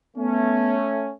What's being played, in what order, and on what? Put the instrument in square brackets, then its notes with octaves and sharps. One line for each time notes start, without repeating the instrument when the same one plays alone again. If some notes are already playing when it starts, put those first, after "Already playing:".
[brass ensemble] A3 C#4 [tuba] B3